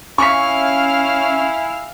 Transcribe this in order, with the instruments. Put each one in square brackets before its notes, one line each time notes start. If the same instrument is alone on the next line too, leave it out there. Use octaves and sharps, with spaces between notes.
[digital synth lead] C#4 [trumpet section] E4 E5 G#5 [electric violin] F5 [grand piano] C#6 B6